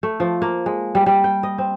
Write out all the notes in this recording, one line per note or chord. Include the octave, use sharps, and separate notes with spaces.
A3
F3
A#3
G#3
G3
G3
G5
D#5
C4